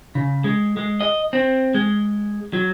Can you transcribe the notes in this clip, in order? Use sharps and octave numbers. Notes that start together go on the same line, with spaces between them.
C#3
G#3
G#3
D#5
C4
G#3
F#3